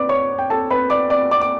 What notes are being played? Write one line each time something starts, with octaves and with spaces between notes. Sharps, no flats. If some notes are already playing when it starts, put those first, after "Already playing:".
Already playing: B4 D5 D6
C#5 C#6
G5
A4 A5
B4 B5
D5 D6
D5 D6
D5 D6
D6